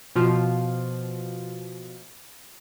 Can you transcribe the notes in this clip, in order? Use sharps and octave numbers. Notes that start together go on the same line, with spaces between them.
B2 F3 F4